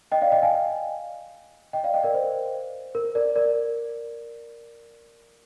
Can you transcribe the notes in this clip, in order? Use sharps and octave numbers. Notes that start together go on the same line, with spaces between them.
D#5 G5
D5 F5
D#5 G5
F5 G#5
D#5 G5
D5 F5
D#5 G5
A#4 D5
C5
A#4
A#4 D5
A#4 D5